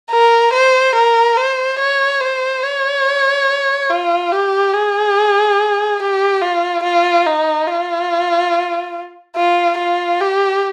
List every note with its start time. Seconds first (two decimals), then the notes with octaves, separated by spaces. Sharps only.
0.11 A#4
0.53 C5
0.95 A#4
1.37 C5
1.79 C#5
2.21 C5
2.63 C#5
3.90 F4
4.32 G4
4.73 G#4
6.00 G4
6.41 F4
6.83 F4
7.26 D#4
7.68 F4
9.37 F4
9.78 F4
10.21 G4